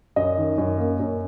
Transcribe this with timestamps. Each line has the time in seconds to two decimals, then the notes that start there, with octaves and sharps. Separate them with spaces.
0.16 F#2 D#5
0.38 D#3
0.58 F#2
0.78 A#3
1.00 F#2